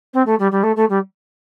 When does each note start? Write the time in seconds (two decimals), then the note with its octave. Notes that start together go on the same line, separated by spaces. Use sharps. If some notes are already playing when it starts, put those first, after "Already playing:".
0.13 C4
0.26 A3
0.39 G3
0.51 G3
0.63 A3
0.76 A3
0.89 G3